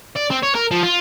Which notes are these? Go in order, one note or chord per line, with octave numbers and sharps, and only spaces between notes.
D5
C4
C#5
A#4
F3
F4